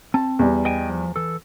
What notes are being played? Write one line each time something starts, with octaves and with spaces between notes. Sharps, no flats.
C4 A5
E2 G3
D#5 G5 G#5
F3
E3 A4